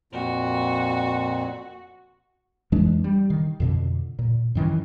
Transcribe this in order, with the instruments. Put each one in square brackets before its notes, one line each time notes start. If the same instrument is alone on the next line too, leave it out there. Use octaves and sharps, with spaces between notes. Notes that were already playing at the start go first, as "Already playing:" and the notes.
[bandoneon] F2 A#2 [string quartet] F#4
[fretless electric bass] F2 E3 G#3 D4
G3
D#3
F2 B2 D3
A#2
F#2 D#3 E3